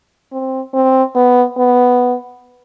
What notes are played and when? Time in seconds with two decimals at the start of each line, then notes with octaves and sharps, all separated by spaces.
0.32 C4
0.74 C4
1.16 B3
1.58 B3